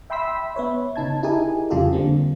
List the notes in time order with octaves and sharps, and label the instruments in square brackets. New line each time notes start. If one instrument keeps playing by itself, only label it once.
[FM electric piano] E5 G5 B5 C6 E6 B6
B3 B4 C#5 E5
C#3 D#4 A5 G#6
D#4 E4 G4 G#4 A#4 G#5
F2 C#3 G3 F4 G4 A4
D3 G3 A#3 C4